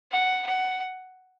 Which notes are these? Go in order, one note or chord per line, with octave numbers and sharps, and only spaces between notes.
F#5
F#5